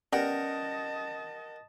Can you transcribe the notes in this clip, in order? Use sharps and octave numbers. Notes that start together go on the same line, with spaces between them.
G3 B3 C#4 A#4 D#5 F#5 G5 A5